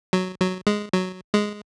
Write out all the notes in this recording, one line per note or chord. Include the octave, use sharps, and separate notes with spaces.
F#3
F#3
G#3
F#3
G#3